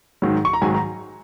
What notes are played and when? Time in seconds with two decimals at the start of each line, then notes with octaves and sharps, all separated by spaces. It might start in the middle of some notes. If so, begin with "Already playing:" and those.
0.22 G#2 D#3 F#3
0.45 C#6
0.53 A#5
0.62 G#2 D#3 F#3 G#5
0.74 A#5